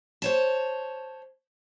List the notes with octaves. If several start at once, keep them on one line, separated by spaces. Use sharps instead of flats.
C5 C#5 A5